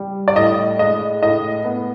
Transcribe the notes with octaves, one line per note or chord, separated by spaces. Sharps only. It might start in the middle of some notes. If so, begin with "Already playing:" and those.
Already playing: G3
D5
A2 D#5
G#3 D#5
A2 D#5
B3